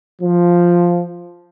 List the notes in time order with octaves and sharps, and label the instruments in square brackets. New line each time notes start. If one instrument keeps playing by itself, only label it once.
[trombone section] F3